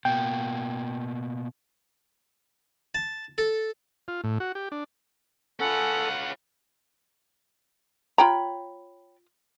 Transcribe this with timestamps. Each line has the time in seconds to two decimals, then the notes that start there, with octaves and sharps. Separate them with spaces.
0.05 B2 A#3 G5
2.95 A5
3.38 A4
4.08 F4
4.24 A2
4.40 F#4
4.55 G4
4.72 D4
5.60 C#4 F4 A4 F#5 G#5 B5 C#7
8.18 F4 C#5 G5 A#5 B5